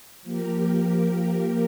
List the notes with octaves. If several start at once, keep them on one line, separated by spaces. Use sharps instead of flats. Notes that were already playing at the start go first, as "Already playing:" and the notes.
F3 A#3 G4 A#4